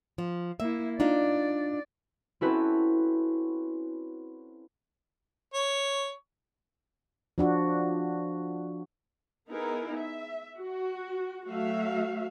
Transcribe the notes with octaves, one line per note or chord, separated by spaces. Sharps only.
F3
A#3 E4 E5
D4 D#4 F4 D5
C4 C#4 E4 F#4 A4 B4
C#5
F3 D4 F#4
B3 D#4 E4 G#4 A#4
E5
F#4
F#3 A3 F#4 E5 F5